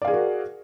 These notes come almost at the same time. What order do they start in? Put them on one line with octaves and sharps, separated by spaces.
D5 F5 G#4 A#4 F#4